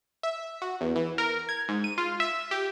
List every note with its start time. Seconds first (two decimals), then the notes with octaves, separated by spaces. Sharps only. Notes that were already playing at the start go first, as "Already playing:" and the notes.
0.23 E5
0.62 F#4
0.81 E2
0.96 E3
1.18 A#4
1.49 G#6
1.69 G#2
1.84 D#7
1.98 F4
2.20 E5
2.51 G4